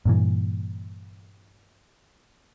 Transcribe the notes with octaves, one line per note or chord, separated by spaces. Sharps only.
G2 A#2 E3